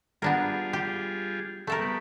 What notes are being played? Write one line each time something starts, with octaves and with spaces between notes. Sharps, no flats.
G3 B3 D4 F4 G#4 A#4
G4
A3 A4 A#4
G3 B3